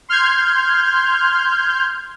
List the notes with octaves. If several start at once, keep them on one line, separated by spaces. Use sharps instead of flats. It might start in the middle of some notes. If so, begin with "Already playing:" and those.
C6 F6 G6 G#6